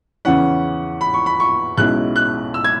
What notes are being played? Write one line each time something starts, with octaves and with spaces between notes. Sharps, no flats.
E2 C#3 E3 C#4 F#5
B5
C#6
B5
C#6
B1 B2 G#3 C#4 E4 F#6
F#6
E6
G#6